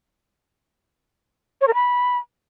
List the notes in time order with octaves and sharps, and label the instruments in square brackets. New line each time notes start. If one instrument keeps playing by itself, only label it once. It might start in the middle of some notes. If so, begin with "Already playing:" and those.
[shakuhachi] C#5
A#4
B5